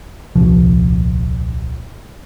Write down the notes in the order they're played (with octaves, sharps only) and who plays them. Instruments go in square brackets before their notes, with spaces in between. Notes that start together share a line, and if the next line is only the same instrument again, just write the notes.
[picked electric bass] D#1 C2 F3